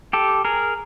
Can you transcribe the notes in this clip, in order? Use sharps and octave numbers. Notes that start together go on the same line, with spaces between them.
G4 A4
G#4 A#4